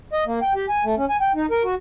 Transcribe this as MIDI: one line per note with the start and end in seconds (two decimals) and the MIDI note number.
0.13 0.24 75
0.26 0.39 58
0.42 0.53 79
0.55 0.66 67
0.69 0.84 80
0.84 0.95 57
0.98 1.05 61
1.10 1.17 80
1.21 1.32 79
1.35 1.46 63
1.51 1.63 70
1.64 1.75 66